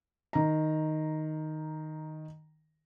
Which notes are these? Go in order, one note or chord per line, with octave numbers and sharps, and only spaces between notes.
D#3 A#5